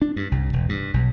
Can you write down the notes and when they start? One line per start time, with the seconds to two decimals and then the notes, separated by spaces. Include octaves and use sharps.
0.02 D4
0.16 G2
0.31 C2
0.53 E1
0.69 G2
0.94 B1